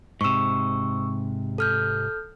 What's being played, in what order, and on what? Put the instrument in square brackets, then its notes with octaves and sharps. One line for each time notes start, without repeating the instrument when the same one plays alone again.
[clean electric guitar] G#2 C3 [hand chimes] C#6 E6
[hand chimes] A4 F6 G6